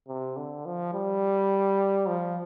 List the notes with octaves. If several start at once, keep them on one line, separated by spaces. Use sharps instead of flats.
C3
D3
F3
G3
F3